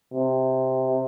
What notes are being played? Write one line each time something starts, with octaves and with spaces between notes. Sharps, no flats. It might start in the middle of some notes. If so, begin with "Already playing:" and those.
C3